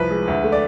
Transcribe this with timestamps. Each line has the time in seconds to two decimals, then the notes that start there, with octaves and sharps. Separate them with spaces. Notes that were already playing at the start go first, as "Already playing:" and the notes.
Already playing: C2 F3 B4
0.10 G#3
0.28 D2
0.44 A3
0.52 D5